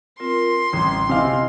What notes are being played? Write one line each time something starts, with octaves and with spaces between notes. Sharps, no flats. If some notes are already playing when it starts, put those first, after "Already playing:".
C4 F4 A#4 C6
A1 G3 D#6
C3 E4 D#5 F5 G#5